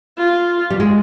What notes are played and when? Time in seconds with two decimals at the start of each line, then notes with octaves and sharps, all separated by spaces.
0.18 F4
0.70 G3
0.80 G#3